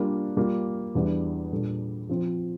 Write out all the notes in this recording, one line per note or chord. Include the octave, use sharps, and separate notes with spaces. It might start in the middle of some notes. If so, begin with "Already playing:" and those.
Already playing: G3 A#3 D4 F4
G3 A#3 F4
E2 E3 G3 D4
A#2 G3 D4 A4
F3 C4 F4 C5